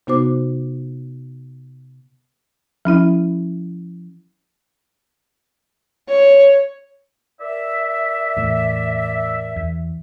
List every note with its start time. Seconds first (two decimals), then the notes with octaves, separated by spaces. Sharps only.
0.07 C3 B3 D#4 F#4 C5 D6
2.85 F3 C#4 E4
6.09 C#5
7.40 A#4 D5 E5
8.37 E2 A2
9.56 E2